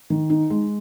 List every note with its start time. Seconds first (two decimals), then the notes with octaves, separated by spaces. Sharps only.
0.10 D#3
0.30 D#4
0.50 G#3